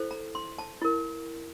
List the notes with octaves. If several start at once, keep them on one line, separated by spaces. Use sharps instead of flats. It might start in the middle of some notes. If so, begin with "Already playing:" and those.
Already playing: E4 A4 C5
A#5
C6
A5
E4 A#4